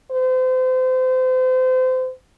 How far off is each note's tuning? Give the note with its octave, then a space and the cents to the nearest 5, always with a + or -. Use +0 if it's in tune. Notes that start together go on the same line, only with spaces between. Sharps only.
C5 -35